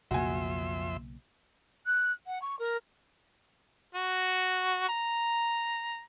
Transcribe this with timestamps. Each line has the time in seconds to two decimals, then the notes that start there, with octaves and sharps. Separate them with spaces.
0.11 B1 F2 C#3 A#3 F#4 E5 G#5 C6
1.86 F#6
2.26 F#5
2.41 C#6
2.59 A#4
3.95 F#4
4.89 A#5